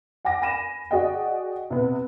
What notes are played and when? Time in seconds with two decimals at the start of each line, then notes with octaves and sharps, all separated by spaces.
0.25 F#5 G#5 D6 A#6
0.42 G#5 B5 A#6 D#7 E7
0.91 F#4 G#4 D5 D#5 F#5 G5
1.70 C3 B3